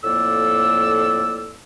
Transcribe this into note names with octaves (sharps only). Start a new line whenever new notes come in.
F2 A2 A#3 A4 D5 E6